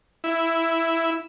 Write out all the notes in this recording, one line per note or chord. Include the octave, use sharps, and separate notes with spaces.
E4